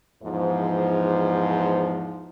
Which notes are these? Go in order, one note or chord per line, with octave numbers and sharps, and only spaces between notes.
E2 G#2 F3